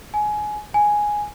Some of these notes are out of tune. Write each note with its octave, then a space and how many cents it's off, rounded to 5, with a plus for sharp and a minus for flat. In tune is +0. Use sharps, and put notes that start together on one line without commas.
G#5 +20
G#5 +0